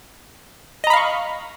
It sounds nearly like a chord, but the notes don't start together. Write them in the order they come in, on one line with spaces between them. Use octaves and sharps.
D#5 A#5 B5 F5 C#6